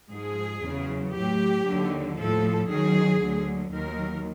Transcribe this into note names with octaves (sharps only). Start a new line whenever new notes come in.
G#2 F3 G#4
E2 C#3 F#3
A2 F#3 G4
D#2 D3 F#3
A2 F3 A4
F#2 D#3 F#3 G#4
D2 D3 F#3
D#2 D#3 F#3 A#4